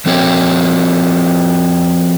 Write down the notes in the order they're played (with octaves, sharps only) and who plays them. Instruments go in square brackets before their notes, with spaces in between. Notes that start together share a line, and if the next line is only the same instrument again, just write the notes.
[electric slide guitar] F3 C4 F#4 C#5